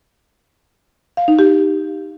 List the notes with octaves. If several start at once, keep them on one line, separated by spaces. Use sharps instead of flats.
F5
D#4
G4